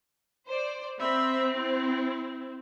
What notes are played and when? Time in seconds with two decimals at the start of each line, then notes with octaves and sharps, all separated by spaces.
0.48 C5 D5
1.00 C4 E5 B5
1.56 E4